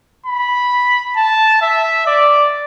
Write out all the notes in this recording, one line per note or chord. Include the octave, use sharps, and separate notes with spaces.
B5
A5
E5
D5